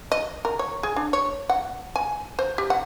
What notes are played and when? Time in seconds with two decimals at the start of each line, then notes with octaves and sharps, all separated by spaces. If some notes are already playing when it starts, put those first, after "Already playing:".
0.12 D#5
0.45 A#4
0.59 C#5
0.83 G#4
0.96 D4
1.13 C#5
1.49 F#5
1.96 G#5
2.39 C5
2.58 G4
2.70 F#5